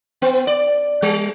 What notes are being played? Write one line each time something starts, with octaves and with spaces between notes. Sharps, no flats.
B3
D5
G3